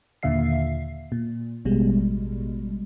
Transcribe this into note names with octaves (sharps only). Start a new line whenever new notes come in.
D#2 A#2 D3 E5 F5 C7
A#2
A1 B2 G3 G#3